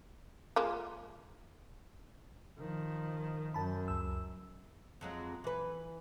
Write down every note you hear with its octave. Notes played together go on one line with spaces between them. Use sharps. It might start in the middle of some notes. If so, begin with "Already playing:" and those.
F3 G#3 A#3
D#3 F3
F#2 A5 B5
C#2 E6
F2 F#3 G#3
E3 B4